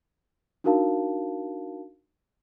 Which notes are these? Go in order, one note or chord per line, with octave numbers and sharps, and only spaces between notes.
D4 D#4 F#4 A#4 F5 A5